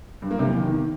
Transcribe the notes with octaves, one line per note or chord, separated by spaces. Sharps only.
G2
A#3
C3
E2
D#3